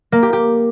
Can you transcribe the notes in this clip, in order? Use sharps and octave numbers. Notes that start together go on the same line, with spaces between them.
A#3
G4
G4